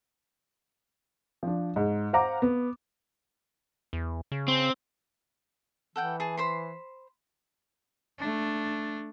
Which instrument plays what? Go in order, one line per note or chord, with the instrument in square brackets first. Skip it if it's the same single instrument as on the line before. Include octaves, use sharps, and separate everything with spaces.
[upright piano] F3 D4
G#2
C5 F5 F#5 A#5 D6
B3
[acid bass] E2
C#3
[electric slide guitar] C4
[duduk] E3 [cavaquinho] A4 F#5 G5
[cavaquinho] G#4 A5
C5 B5 C6
[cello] A3 D4